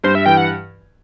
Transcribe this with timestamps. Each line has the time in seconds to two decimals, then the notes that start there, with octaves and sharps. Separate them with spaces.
0.04 G2 C5
0.15 E5
0.26 E3 G5
0.37 F#5